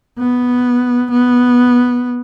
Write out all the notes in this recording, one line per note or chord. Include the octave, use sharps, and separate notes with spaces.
B3
B3